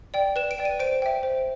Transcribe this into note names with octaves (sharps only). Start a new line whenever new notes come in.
D5 G5
B4 E7
D7
D5 G5
D#7
C5 D7
E5 G5
C5